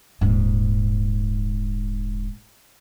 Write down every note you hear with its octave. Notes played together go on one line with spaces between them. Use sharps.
D#1 G#2